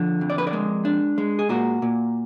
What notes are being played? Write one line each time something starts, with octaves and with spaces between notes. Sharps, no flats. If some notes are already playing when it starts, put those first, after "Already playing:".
Already playing: D3 F3
F2
D5
B4
A#4 D5
G#3
D4
G#3
G#4
A#2 F#4 A#4
A#2